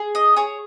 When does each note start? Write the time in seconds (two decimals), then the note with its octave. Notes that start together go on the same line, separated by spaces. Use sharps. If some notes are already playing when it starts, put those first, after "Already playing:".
Already playing: G#4
0.15 D#5
0.36 G#4 C#5